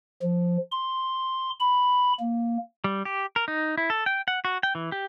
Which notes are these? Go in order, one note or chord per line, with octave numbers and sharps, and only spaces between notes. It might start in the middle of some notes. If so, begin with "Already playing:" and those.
F3
C6
B5
A#3
G3
G4
A#4
D#4
E4
A4
G5
F#5
F#4
G5
E3
G4